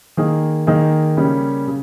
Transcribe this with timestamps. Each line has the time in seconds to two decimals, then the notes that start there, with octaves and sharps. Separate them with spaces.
0.17 D#3 A#3 D#4 G#4
0.67 D#3 A#3 D#4 G#4
1.17 C#3 G3 A#3 C#4
1.68 C#3